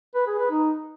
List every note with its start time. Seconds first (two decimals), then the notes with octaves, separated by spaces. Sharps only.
0.15 B4
0.27 G#4
0.39 B4
0.51 D#4